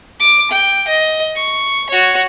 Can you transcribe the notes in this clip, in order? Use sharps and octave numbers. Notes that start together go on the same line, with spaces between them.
D6
G5
D#5
C#6
F#4 C#5